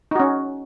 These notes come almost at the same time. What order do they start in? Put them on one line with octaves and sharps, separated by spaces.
D#4 F#4 C#4